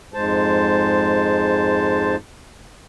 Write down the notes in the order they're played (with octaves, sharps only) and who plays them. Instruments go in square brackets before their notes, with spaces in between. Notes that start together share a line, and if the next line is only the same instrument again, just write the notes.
[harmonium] F2 G#2 G#3 C5 A5